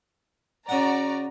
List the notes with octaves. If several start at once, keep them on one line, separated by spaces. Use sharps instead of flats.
C#3 F#4 D5 F#5 A#5